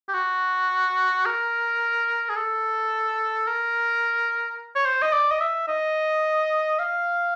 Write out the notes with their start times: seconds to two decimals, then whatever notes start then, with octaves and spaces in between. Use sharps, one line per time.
0.08 G4
0.14 F#4
1.26 A#4
2.29 G#4
2.36 A4
3.47 A#4
4.75 C#5
4.86 C5
5.02 D#5
5.13 D5
5.32 D#5
5.41 E5
5.68 D#5
6.79 F5